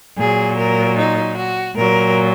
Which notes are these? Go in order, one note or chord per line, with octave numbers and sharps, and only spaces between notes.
A#2 F#3 G#4
A#4
D#4
F#4
A#2 F#3 A#4